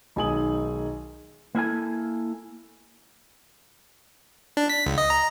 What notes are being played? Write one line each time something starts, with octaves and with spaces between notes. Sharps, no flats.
B1 D#3 G#3 G#5 D#6 F#7
A#3 E4 A4 G#5
D4
B6
C#2
D#5
A#5